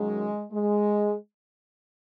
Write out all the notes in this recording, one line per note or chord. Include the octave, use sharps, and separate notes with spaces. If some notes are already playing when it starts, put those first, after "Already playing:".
Already playing: F#2 D#3 F#3 G#3
G#3